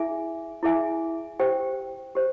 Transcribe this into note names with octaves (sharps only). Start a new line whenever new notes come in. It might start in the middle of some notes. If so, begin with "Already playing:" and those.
Already playing: E4 G#4 E5 G#5
E4 G#4 E5 G#5
G4 C5 G5
G4 C5